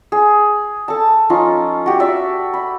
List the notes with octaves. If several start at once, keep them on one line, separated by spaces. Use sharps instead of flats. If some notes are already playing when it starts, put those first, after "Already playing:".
G#4
A4 A5
F3 C#4 D#4 F4
F#4 G4
D5 E5
B5